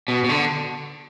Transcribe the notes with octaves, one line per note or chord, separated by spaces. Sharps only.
B2
B2
D3